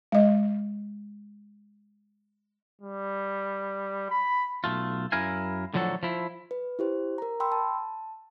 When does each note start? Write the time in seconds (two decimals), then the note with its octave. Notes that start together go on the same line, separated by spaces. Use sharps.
0.12 G#3 D#5
2.81 G3
4.10 B5
4.64 B1 A3 F4
5.12 F#2 E4 A#4 F5 G#5
5.74 A2 D3 F3 F#3 F#4 A4
6.03 F3 E4
6.51 B4
6.79 E4 G4 C5
7.18 A#4 A#5
7.40 G5 B5 C6 E6
7.52 A5